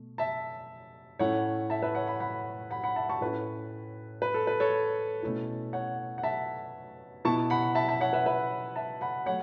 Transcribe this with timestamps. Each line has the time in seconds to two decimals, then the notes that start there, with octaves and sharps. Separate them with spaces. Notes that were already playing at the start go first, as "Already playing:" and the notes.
Already playing: B2 A3
0.18 E5 A5
1.19 A2 A3 C#4 E4 C#5 F#5
1.70 E5 A5
1.82 B4 E5
1.95 C#5 F#5
2.07 F#5 B5
2.20 F#5 B5
2.71 F#5 B5
2.83 F#5 B5
2.96 E5 A5
3.09 A5 C#6
3.21 A2 A3 C#4 E4 B4
4.22 B4
4.34 A4
4.47 B4
4.60 A4 C#5
5.23 B2 A3 C#4 E4
5.73 C#5 F#5
6.18 F#5
6.23 E5 A5
7.25 B2 B3 E4 A5 C#6
7.50 F#5 B5
7.75 E5 A5
7.89 E5 A5
8.01 C#5 F#5
8.13 B4 E5
8.26 B4 E5
8.76 E5 A5
9.01 F#5 B5
9.26 F#3 A3 C#5 F#5